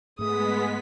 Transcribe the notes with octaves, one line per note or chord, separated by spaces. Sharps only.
G#2 G#3 A3 B3 G#4 D#6 B6